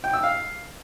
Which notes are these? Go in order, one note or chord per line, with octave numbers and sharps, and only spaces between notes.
G5
E6
F5